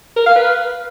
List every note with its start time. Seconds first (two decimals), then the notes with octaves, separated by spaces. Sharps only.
0.16 A#4
0.26 F5
0.36 B4